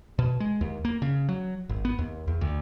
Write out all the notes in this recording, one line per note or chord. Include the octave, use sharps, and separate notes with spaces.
B2
G#3
D#2
A#3
C#3
F#3
G#1
B3
D#2
E2
D2